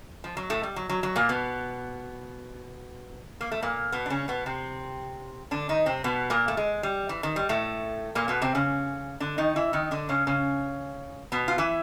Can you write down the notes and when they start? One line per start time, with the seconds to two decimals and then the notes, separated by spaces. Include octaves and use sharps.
0.24 F3
0.37 F#3
0.50 A2 A3
0.63 G3
0.76 F#3
0.89 F#3
1.03 F#3
1.16 A#2 A#3
1.29 B2 B3
3.41 A#3
3.52 A3
3.62 A#2 A#3
3.92 B2 B3
4.06 D4
4.10 C#3 C#4
4.28 B2 B3
4.46 C3 C4
5.51 D3 D4
5.69 D#3 D#4
5.86 C3 C4
6.04 B2 B3
6.30 A#2 A#3
6.48 A3
6.57 G#3
6.83 G3
7.09 E3
7.23 D#3
7.36 G3
7.49 A2 A3
8.15 A#2 A#3
8.28 B2 B3
8.42 C3 C4
8.55 C#3 C#4
9.20 D3 D4
9.38 D#3 D#4
9.56 E3 E4
9.73 D#3 D#4
9.91 D3 D4
10.09 C#3 C#4
10.27 C#3 C#4
11.32 B2 B3
11.48 F4
11.58 E3 E4